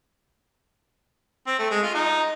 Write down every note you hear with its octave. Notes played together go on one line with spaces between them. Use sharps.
C4
A3
G#3
F4
D#4